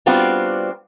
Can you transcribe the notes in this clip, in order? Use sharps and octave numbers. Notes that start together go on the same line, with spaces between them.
G3 B3 C4 D4 F4 F#4